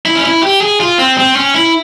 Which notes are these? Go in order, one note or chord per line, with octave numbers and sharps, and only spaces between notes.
E4
C#4
E4
G4
G#4
F4
C4
C4
C#4
E4